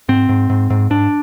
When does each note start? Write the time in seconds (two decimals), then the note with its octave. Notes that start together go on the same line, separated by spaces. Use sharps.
0.09 G#2 C4
0.29 G#2
0.50 G#2
0.70 G#2
0.90 G#2 D4